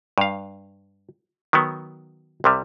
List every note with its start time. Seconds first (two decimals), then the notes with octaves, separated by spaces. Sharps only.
0.18 G2 F5
1.53 D#3 F#3 B3
2.44 C2 C3 G3